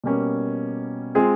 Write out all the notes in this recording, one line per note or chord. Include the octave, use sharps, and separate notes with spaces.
B2 G3 A#3 C#4
G#3 C4 F4 G#4